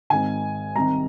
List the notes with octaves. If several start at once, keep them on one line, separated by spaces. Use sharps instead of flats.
G#1 G#2 D#3 G#5
C2 C3 D#3 A#5